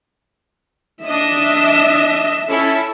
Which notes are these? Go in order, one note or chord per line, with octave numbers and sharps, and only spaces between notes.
D4 D#5 E5
C#4 E4 A4